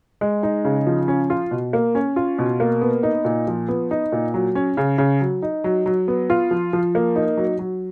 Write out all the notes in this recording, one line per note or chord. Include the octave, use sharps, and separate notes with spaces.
G#3
D#4
C#3
F3
C#4
F4
B2
A#3
C#4
F4
B2
A#3
B3
D#4
A#2
F3
B3
D#4
A#2
F#3
C#4
C#3
C#3
F#3
D#4
F#3
F#3
B3
F4
F3
F3
A#3
D#4
F#3
F#3